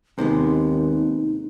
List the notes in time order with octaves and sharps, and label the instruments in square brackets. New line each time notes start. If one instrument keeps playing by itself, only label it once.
[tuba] D#2 [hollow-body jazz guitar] C3 G#3 B3 [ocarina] D#4